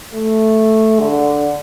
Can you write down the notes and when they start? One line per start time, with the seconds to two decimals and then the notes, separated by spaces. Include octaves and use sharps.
0.12 A3
1.00 D3